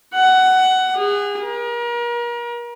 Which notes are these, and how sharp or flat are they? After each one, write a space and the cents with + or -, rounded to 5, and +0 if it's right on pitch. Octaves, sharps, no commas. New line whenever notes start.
F#5 +15
G#4 -30
A#4 +35